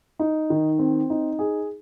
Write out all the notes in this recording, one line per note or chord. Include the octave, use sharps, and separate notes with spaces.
D#4
D#3
C4
D#4
G#4